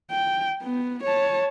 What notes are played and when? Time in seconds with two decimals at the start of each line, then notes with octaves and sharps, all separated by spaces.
0.11 G5
0.63 B3
1.03 C#5 A5